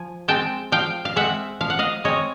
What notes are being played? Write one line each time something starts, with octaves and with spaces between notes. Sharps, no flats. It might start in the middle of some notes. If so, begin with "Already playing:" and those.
Already playing: F3 G#5
G#3 C4 G5 A5
F3 F5 G5
F5
G#3 C4 E5 F#5
F3 F5
F#5
D#5 F5
G#3 C4 C#5 D#5